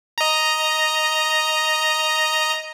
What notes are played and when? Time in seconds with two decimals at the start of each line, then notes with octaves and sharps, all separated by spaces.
0.18 D#5 A#5